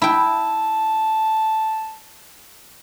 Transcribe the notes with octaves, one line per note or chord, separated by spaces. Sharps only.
E4 G5 A5